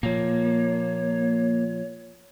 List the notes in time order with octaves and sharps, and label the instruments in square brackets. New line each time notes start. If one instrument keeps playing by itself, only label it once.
[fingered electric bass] A#2 F3 [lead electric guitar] A#3 [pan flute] C#5